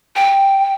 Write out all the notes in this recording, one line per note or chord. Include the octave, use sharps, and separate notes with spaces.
G5